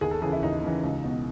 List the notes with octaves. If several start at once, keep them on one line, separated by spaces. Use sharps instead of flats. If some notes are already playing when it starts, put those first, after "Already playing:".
D#2 G#4
A4
C#3 E3 G#4
E4
D#2 D#4
C#3 E3
C#2
B2